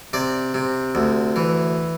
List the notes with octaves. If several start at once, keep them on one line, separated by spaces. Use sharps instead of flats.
C3 D5
C3
D2
E3